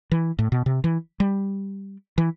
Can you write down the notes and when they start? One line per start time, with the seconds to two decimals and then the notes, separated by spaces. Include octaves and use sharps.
0.12 E3
0.39 A2
0.52 B2
0.66 C3
0.84 E3
1.20 G3
2.18 E3